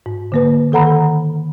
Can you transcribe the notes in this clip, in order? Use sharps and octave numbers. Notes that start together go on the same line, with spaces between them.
G#2
D3 A#3 B4
D#3 A4 F#5 A#5 B5